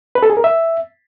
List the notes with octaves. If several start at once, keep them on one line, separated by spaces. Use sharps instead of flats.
B4
A4
G#4
A#4
E5